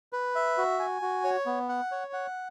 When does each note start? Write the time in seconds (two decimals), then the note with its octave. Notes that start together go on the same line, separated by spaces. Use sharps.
0.13 B4
0.36 E5
0.58 F#4
0.79 G#5
1.02 F#4
1.24 C#5
1.46 B3
1.69 F#5
1.92 C#5
2.13 F#5